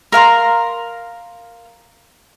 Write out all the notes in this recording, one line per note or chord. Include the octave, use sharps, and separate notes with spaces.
A#4 F5 A#5 C6